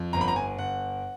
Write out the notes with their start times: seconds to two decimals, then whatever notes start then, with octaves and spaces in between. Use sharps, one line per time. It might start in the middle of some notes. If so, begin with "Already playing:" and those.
Already playing: F2
0.13 G1 A#5
0.21 B5
0.28 A#5
0.36 G#5
0.59 G1 F#5